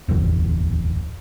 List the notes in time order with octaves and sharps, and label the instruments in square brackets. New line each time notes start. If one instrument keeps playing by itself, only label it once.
[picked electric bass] D1 G1 E2